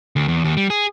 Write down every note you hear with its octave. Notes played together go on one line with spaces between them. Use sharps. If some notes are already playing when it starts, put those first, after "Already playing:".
D2
E2
D#2
G3
G#4